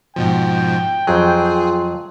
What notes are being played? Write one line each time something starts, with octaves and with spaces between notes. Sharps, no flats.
G#2 B2 F3 G5
F2 F#3 F4 G#4